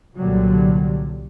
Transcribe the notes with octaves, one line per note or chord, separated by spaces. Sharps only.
C2 A#2 D3 F#3 G3